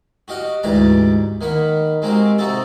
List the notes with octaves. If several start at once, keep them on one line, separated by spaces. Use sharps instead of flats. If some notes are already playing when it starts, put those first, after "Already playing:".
F#4 G4 D#5 F5 F#5
D2 G#2 E3 G4 D5 A#5
D#3 A#3 F#5 B5
G#3 A#3 C4 F#4 G4
C3 C4 D#4 F#4 A4